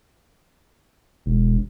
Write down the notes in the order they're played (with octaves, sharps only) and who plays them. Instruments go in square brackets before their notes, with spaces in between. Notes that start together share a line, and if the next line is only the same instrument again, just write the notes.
[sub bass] E1